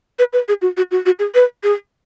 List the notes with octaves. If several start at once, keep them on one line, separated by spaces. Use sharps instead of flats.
B4
B4
G#4
F#4
F#4
F#4
F#4
G#4
B4
G#4